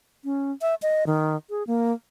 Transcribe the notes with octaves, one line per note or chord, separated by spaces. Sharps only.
C#4
E5
D#5
D#3
G#4
A#3